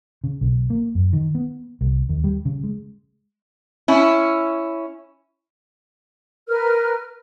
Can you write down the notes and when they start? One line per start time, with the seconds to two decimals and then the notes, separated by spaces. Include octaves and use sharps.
0.24 C#3
0.41 B1
0.70 A#3
0.95 F#2
1.13 D#3
1.35 B3
1.81 C2
2.09 D#2
2.24 G3
2.45 C#3
2.64 G#3
3.88 C#4 E4
6.48 A#4 B4 F6